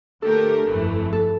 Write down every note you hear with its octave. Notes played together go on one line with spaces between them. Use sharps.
D3 A3 D4 G4 A4 A#4
G1 F2 E3 A3
A4